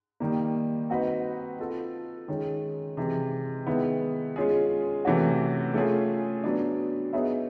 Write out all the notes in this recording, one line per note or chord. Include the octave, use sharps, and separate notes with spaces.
D#3 G3 A#3
C4 D#4 F#4 B4 D#5
C4 F4 A4
D#3 G#3 C#4
C3 E3 G#3
D#3 G#3 B3 E4
G#3 C#4 F4 G#4
C3 E3 A3 C#4 F#4
A3 C#4 F4 G#4
F#3 B3 D4
B3 D#4 G#4 C#5 E5